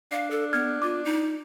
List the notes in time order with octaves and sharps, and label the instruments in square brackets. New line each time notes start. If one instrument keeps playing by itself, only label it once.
[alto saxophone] D4 [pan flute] F5
[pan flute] A4
[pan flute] B3 [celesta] F6 G#6
[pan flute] F4 [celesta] D6
[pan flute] D#4